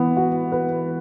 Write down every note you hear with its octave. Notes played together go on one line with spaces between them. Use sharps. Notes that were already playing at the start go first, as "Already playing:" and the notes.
Already playing: E3 B3
F#4
B4